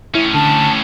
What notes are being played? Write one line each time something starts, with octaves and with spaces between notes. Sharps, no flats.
A2 C#4 E4
D3 A5